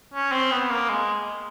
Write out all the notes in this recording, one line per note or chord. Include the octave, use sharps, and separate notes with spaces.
C#4
C4
B3
A#3
G#3